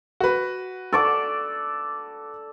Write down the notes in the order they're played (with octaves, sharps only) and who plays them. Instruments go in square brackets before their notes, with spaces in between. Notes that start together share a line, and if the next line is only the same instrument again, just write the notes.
[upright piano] F#4 B4
[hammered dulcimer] A4 D5 D6